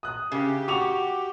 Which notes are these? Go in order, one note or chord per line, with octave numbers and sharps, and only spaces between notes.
D#6 F#6
C#3 G4
F#4 C#6 D6 F7